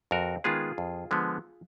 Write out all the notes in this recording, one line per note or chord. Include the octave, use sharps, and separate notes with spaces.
F2 F#4 A#4
D#3 G#3 B3 F4 G#4
F2
D3 F3 G#3 B3